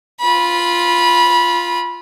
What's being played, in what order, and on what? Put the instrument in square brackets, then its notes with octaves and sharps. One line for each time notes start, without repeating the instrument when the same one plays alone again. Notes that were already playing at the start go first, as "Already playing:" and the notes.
[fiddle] F4 B5